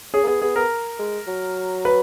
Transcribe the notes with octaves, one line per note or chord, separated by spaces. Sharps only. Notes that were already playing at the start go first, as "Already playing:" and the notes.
C#4 G#4
A#3
B3 G#4
B3 G#4
B3 A#4
G#3
F#3
B4